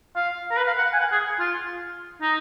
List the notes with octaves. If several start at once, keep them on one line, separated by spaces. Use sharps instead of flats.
F5
A#4
B4
F5
F#5
G#5
F#5
G#4
F4
D#4